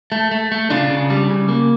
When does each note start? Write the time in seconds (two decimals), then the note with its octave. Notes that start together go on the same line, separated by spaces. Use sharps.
0.12 A3
0.31 A3
0.52 A3
0.70 C#3 D4 F4
0.90 C#3
1.10 G3
1.30 C#3
1.49 A#3